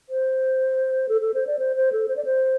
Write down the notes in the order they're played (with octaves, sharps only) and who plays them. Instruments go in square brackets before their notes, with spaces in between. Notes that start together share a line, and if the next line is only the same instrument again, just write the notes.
[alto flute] C5
A4
A4
C5
D5
C5
C5
A4
C5
D5
C5